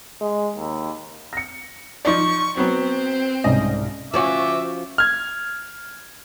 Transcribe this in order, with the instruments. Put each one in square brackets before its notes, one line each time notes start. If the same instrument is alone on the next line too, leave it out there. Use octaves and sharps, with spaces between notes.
[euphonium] G#3
D#2
[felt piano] A#6 C#7
[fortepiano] F3 D#4 D5 [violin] C#6
[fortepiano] F#3 B3 [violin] C4
[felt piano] C2 G#2 C#4 [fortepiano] D#5
[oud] F3 C#4 F#4 [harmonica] E5 D6
[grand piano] F6 G#6